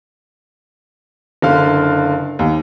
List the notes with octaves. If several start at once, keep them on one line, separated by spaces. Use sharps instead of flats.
F#1 D3 F5
D#2